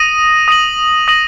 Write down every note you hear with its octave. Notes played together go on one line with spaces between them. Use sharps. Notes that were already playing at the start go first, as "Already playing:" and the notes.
Already playing: D#6 A#6 D#7 F#7
D#6 A#6 D#7 F#7
D#6 A#6 D#7 F#7